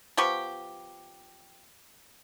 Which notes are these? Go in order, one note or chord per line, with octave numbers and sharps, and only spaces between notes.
F3 B3 G4 C#6